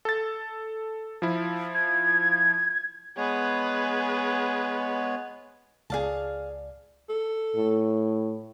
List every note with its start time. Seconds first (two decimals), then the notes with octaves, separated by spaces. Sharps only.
0.05 A4 A6
1.22 F3 E4
1.74 G#6
3.17 G#3 B3 G#4 B4 C#5
5.90 C#2 G#4 D5 F5 A5
7.09 A4
7.56 A2